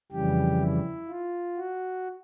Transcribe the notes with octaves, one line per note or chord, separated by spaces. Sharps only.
F2 C#3 E3 G3 G4
E4
F4
F#4